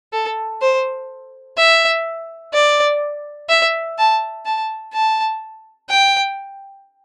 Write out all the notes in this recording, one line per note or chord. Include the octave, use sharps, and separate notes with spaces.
A4
C5
E5
D5
E5
A5
A5
A5
G5